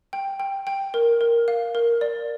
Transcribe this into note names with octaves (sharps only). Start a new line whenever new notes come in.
G5
G5
G5
A#4
A#4
F5
A#4
D5